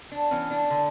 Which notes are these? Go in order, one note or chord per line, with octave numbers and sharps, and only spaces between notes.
D4
E3 B3 C#4
D4
D3